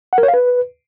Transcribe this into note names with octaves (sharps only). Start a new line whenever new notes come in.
F#5
A#4
C#5
F5
B4